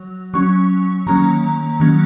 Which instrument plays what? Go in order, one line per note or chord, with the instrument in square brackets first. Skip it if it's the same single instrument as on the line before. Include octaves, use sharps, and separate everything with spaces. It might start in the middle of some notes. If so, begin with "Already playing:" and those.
Already playing: [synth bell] F#3
F#3 C#4 C#6
D#3 F#3 A#3 C#4 A#5
D#3 F#3 A#3 C#4